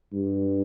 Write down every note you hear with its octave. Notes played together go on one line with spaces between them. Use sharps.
G2